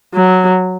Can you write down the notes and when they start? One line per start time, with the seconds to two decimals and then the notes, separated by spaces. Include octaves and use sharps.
0.14 F#3